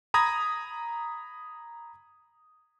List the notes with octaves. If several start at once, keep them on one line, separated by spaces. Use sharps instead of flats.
A#5 B5 D#6 G#6 A#6